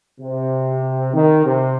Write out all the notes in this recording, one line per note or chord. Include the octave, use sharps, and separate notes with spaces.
C3
D#3
C3